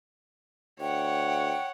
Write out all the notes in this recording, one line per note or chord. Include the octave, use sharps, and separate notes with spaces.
D2 C#5 F#5 G5